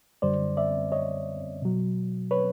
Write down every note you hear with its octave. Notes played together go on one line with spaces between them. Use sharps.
F#2 D3 G3 C5 D5
D5 E5
C#5 D#5
B2 F#3
B4 C#5